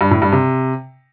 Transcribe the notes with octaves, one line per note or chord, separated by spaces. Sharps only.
G2
A2
G2
C3